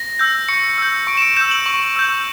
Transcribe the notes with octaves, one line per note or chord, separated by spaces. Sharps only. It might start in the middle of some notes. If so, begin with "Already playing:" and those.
Already playing: A#6
E6 G6
C#6 C#7
E6 G6
C#6 D7
E7
D7
E6 G6 E7
F#7
C#6
E6 G6